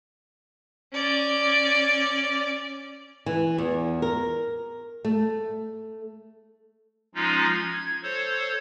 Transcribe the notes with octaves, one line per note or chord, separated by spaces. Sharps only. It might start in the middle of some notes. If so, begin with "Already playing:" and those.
C#4 D5
E3
E2
A#4
A3
F3 G#3 C#4 D#4 F4
G#6
A4 C5 C#5